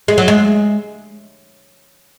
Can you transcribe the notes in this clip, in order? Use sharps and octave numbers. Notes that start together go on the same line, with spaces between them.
G#3
F#3
G#3